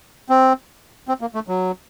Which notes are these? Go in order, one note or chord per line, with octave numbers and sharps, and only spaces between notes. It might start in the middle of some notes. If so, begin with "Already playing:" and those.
C4
C4
A#3
A3
F#3